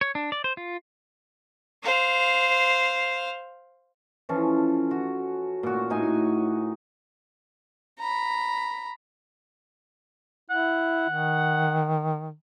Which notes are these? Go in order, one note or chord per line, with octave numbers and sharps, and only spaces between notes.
C#5
D4
D5
C5
F4
C5 F5
E3 F3 C#4 A4
F#4
A#2 F#4
A2 D#4 G#5
A#5 B5
E4 F#5
D#3